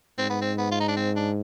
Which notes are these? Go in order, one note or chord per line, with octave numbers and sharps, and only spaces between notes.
G#2 C4
B3
C4
B3
F4
D#4
D4
C4
D4